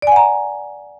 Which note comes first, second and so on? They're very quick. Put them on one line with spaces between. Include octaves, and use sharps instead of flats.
D5 G#5 F#5 A#5